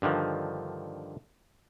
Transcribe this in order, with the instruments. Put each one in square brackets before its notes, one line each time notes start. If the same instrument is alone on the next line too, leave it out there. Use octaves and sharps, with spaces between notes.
[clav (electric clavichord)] G2 D3 D#3 F3